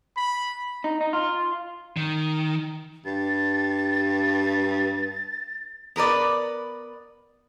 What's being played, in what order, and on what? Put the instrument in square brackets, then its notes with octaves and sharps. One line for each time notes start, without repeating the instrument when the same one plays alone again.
[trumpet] B5
[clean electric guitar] D#4
D#4
F4
[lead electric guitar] D#3
[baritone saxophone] G2 [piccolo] A6
[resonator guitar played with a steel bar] B3 A#4 B4 D5